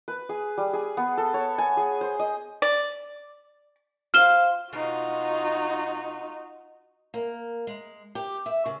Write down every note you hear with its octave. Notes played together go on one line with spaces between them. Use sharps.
B4
G#4
G3
G#4
B3
A4
C#5
G#5
G#4
C5
D#5
D5
F4 C5 F5 F6 E7 G7
B2 G#3 D#4 F4 F#4
A#3
G#3
G4
E5
C#3